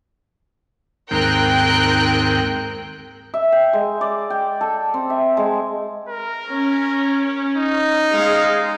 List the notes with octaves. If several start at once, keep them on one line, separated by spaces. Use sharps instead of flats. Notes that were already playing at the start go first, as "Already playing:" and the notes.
D#2 G#2 C4 A#4 G5 F#6
E5
G5
G#3
D5
G5
A4
C4
E5
G#3
A#4
C#4
D#4
G#3 F5